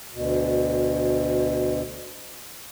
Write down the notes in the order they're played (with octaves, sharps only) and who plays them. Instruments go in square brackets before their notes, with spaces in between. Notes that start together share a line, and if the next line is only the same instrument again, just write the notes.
[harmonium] D2 B2